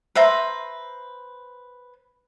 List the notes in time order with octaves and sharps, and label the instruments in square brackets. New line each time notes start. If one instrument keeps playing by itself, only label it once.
[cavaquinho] B4 C5 E5 A#5